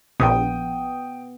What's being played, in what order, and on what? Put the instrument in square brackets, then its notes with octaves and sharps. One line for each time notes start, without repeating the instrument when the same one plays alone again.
[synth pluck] A#1 [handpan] B3 [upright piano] G5 D#6